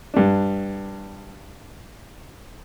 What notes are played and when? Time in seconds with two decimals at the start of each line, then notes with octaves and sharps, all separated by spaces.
0.14 G2 D4